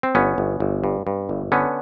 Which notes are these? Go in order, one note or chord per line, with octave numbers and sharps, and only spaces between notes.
C4
G1 B3 C#4
G1
G1
G2
G2
G1
D3 B3 C#4